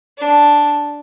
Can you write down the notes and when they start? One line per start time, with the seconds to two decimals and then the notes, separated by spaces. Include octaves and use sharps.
0.18 D4